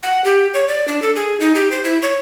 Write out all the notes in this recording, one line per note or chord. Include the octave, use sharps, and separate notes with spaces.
F#5
G4
C#5
D5
D4
A4
G#4
D#4
G4
C5
E4
C#5